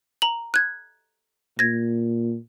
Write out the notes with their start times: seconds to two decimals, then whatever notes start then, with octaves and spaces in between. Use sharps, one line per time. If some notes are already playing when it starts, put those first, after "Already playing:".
0.22 A#5 F#7
0.54 F#6 G#6
1.59 A#2 G#6 A#6